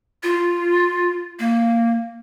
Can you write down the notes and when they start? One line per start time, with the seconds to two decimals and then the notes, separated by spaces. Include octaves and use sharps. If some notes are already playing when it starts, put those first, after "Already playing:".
0.23 F4
1.39 A#3